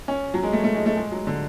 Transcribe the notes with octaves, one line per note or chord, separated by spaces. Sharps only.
C#4
F#3
G#3
A3
A3
G#3
A3
G#3
F#3
D3